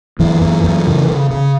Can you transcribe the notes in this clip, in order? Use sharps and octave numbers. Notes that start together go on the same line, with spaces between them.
F#2 E3
F#2
F#2
C#3
C#3
C#3